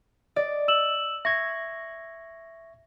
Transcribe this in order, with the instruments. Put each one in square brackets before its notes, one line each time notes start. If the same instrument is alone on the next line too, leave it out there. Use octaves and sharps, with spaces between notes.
[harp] D5 [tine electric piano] D#5
[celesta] E6 E7 F#7
[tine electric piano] E5 C#6 G#6 [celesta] A#6